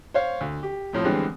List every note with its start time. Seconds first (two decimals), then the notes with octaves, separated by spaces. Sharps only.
0.14 C5 C#5 F5
0.41 D2
0.63 G4
0.93 F2 A2 F3
1.04 D3 E3 G3 G#3 B3 C4